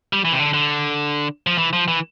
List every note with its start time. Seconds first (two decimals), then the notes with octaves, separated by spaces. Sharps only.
0.13 G3
0.25 E3
0.32 C3
0.39 D3
0.54 D3
1.47 F3
1.58 E3
1.73 F3
1.88 E3